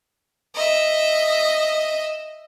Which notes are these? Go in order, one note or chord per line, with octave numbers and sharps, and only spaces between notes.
D#5 E5